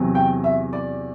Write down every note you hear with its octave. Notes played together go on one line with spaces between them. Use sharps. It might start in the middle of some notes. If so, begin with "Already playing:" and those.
Already playing: E2 C3 F#3
G5
E5
D5